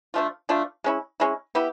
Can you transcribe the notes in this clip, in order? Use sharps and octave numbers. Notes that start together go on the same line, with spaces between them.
F3 A3 D4 F4
F3 A3 D4 F4
G#3 C#4 E4
G#3 C#4 E4
B3 E4 G4